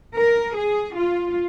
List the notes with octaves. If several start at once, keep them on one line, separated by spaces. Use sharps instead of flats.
A#4
G#4
F4